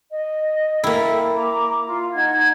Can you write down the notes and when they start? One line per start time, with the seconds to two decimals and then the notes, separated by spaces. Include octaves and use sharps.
0.11 D#5
0.84 A#3 E4 A4 E5 G5
1.35 A#5 D6
1.85 F4
2.14 D#4 F#5 G#6